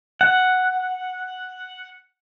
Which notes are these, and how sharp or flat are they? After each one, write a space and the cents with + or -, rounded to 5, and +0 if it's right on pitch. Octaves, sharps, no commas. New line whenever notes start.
F#5 +0